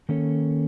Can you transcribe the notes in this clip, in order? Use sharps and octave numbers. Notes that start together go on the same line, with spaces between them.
D#3 A#3 C#4 A4 C#5